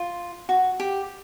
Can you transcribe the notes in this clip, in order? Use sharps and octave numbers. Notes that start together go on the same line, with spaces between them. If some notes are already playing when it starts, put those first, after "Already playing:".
Already playing: F4
F#4
G4